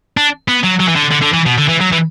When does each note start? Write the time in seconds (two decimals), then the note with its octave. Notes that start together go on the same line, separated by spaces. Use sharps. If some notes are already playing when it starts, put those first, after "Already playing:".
0.17 D4
0.48 B3
0.64 F#3
0.80 F#3
0.89 E3
0.96 D3
1.11 D3
1.22 D3
1.33 E3
1.46 B2
1.57 D3
1.68 E3
1.80 F#3
1.92 E3